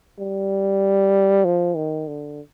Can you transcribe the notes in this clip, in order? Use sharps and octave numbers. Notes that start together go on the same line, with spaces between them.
G3
F3
D#3
D3